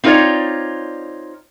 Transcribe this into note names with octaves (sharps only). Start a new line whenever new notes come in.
C4 D#4 F4 A4 C#5 D5